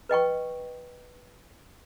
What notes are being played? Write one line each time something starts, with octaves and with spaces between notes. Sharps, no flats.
B4 D#5 G5 C#6